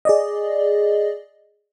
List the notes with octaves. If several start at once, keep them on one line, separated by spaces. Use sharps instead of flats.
G#4 D5 D#5